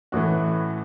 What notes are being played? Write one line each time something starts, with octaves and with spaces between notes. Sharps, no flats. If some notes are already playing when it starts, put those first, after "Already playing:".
A1 A2 E3 F#4